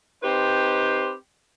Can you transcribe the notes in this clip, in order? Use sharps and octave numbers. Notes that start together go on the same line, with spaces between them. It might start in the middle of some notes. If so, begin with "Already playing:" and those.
C4 D#4 G4 B4 C5